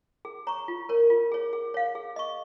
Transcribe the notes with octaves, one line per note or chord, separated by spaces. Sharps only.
G#4
C#5 A#5 C#6
F4
A#4 C#5
F4
G#4 C#5
G#4
C#5 F5
G#4
D#5 C#6